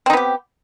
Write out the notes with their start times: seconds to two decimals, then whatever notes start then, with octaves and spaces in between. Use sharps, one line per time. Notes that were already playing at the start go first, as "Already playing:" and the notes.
0.06 C4
0.10 D#4
0.13 B3
0.17 G4